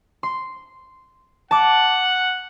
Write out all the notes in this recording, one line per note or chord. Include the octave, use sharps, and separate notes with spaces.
C6
F#5 A5 D6